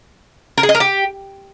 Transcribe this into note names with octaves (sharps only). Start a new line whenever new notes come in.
A#4
G#4
D#5
A#4
G4